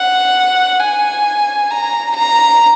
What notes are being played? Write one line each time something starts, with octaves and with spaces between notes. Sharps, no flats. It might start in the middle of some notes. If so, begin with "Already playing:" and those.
Already playing: F#5
G#5
A#5
A#5